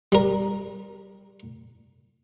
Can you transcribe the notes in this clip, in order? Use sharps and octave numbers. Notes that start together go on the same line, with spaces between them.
G3 A#4